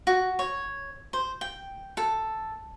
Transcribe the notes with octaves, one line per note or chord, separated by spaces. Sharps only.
F#4
C#5
C5
G5
A4